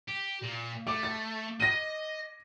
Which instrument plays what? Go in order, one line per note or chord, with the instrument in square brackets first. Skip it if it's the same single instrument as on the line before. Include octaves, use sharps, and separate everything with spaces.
[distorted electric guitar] G4
A#2
[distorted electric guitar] A3 [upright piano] D6
[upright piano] A6
[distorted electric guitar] D#5 [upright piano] A#6 D#7